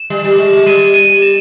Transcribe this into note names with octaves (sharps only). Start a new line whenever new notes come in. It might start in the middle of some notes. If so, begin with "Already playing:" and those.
Already playing: E7
G3
G3
G#3
G#3
G3 D#7
D#7
E7